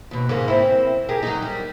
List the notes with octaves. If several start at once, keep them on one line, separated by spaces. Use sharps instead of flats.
D#2 B2
G#2 C#3 A#3
C4 E4
G4 G#4 A#4
F#3 D#4
G3